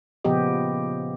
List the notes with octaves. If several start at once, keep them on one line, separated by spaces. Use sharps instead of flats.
A#2 C#3 F3 B3 G4 D#5